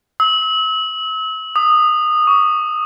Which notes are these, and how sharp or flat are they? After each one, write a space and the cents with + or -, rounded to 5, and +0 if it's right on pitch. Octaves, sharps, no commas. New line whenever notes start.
E6 -40
D#6 -20
C#6 +35